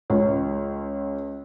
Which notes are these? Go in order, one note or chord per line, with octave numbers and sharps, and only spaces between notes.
C#2 C#5